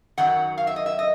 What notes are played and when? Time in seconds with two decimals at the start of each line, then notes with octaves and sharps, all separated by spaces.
0.18 F#2 D#3 F#3 F#5
0.58 F5
0.67 E5
0.76 D#5
0.86 E5
0.99 D#5